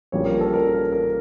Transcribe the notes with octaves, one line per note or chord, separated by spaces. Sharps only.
A#1 A#2 G3 A#3 C#4 C#5
A#4
A4
A#4
A#4